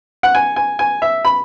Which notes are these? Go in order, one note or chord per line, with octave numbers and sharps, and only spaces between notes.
F#5
G#5
G#5
G#5
E5
B5